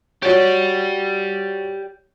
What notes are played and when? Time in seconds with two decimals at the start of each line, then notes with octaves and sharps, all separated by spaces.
0.22 F#4 G4 C#5 D5